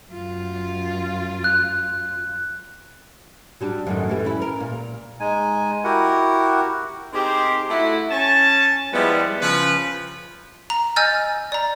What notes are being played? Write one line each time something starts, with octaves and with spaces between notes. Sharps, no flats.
F#2 F4
F#6
F#3 G3 D4
F#2 A2 D#3
E3 G3 A3
C#4 E4
A#4
A#2
G#3 D#4 G#5
E4 F#4 G4 A#4 F#5
C4 D#4 G4 G#4 A#4 C5
A3 E4 F#4
C#4 A5
F3 G3 G#3 B3 E4
C#3 F3 B4
A#5
D#5 G#5 E6 F6 G6 A6
D5 A#5